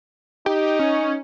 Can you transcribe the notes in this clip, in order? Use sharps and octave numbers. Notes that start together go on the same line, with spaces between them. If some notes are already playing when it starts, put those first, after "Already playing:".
D#4 G4
C#4